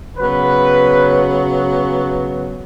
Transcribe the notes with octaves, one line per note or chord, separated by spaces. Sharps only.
C#3 F#3 B3 B4